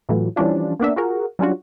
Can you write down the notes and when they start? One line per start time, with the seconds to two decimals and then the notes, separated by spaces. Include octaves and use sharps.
0.09 A2 E3 F#3 A3 F4
0.36 E3 F3 G3 C#4 D4 F4
0.80 A#3 B3 D4 E5
0.96 F4 F#4 G#4 A#4
1.39 F#3 G3 C#4 D4 F4 F#4